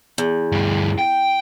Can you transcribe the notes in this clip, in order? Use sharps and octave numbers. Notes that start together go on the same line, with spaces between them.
E2
D2 G2
G5